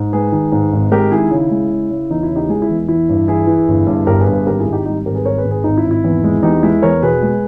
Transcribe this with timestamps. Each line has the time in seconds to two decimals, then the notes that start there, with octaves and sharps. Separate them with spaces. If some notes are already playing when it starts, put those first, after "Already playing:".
Already playing: G#2
0.13 G#3 G#4 B4
0.32 D#3
0.52 G#2
0.73 G#1
0.91 G#3 G4 A#4
1.11 D#3 E4 G#4
1.31 C#3 E4
1.51 G#3
1.71 C#3
1.90 C#3
2.10 E2 D#4
2.23 E4
2.29 C#3
2.36 D#4 G4
2.49 G#3 E4 G#4
2.62 E4
2.70 E2
2.88 E3 E4
3.09 G2
3.28 E3 E4 G#4
3.47 E3
3.68 G1
3.87 G2
4.06 G1 G4 A#4
4.20 G#4 B4
4.27 G2
4.33 G#4 B4
4.46 G#1 G4 A#4
4.60 E4 G#4
4.66 G#1
4.72 D#4 G4
4.86 G3 D#4 G4
5.06 G#1 G4 A#4
5.15 G#4 B4
5.25 G#1 A#4 C#5
5.38 G#4 B4
5.45 G#1
5.51 G#4 B4
5.64 G#1 D#4
5.77 E4
5.85 G#1
5.91 E4
6.04 E2
6.24 G#3
6.43 E2 D#4 G4
6.63 G#3 E4
6.82 E2 A#4 C#5
7.02 B2 G#4 B4
7.23 G#3